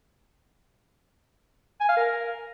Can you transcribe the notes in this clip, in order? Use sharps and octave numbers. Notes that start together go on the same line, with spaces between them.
G#5
F5
A#4